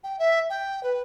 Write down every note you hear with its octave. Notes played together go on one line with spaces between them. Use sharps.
G5
E5
G5
B4